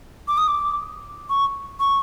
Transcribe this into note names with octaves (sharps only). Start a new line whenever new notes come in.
D6
D#6
D6
C#6
C#6